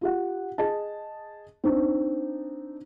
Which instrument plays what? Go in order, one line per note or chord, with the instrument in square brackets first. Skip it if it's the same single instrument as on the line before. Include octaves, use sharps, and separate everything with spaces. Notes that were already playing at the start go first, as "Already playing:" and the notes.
[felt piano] F4 G4 F#5
G#4 D#5 A5
C4 D4 D#4